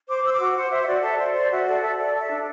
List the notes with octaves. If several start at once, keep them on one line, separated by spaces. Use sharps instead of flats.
C5 D6
C5 E6
D6
F#4
C5 F#5
C5 E5
E5
F#4 D5
A4 E5
C5 D5
C5 D5
F#4 E5
A4 D5
A4 E5
A4 D5
A4
E5
D4